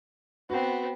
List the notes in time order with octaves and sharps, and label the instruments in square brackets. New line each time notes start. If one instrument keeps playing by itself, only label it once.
[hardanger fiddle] B3 C4 [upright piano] F#4